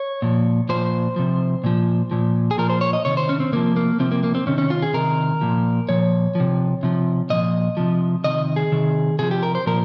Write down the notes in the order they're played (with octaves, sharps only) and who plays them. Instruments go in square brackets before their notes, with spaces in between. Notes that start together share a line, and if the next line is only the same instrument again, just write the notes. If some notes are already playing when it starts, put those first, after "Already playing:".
Already playing: [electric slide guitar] C#5
A#2 F3
A#2 F3 C5
C3 F3
A#2 F3
A#2 F3
G#4
A#2 F3 A#4
C5
C#5
D#5
C3 D#3 C#5
C5
C#4
C4
C3 F3 A#3
A#3
C3 F3 C4
A#3
A#3
C4
C3 D#3 C#4
C#4
F4
G#4
C3 D#3 A#4
A#2 F3
A#2 F3 C#5
C3 F3
C3 F3
A#2 F3 D#5
C3 F3
C3 D#3 D#5
G#4
C3 D#3
C3 F3 G#4
G4
A#4
C5
A#2 F3 A#4